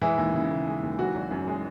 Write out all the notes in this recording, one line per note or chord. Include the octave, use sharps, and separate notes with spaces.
E3 G#3 E4
D#2
C#3
D#2
G#3
D#2
E3 F#3 F#4
G#1
F#2
G#3